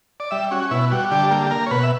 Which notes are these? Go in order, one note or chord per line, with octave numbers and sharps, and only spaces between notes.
D5
G3 E5
C#4 F#4
B2 E4
G3 F#4
D3 G4
A#3 G4
G4
A#3 A#4
C#5
B2 B4
E5